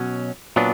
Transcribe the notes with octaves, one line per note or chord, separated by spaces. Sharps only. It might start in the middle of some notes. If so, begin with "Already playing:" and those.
Already playing: B2 F#3 C#4
A#2 F#3 B3 D4